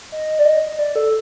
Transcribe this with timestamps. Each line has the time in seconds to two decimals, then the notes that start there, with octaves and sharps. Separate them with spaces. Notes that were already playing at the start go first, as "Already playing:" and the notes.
0.12 D#5
0.39 D5
0.45 D#5
0.79 D5
0.96 A4